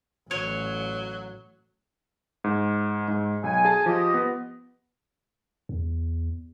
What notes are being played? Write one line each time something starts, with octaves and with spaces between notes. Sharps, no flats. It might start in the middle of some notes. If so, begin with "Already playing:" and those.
A1 F#3 C#5
G#2
G#2
B1 G#5
G#4 A5
F3 G4 D#5
B3
E2